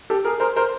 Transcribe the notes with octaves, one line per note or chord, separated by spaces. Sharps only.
G4 A4
G#4 A#4
A#4 C5
A#4 C5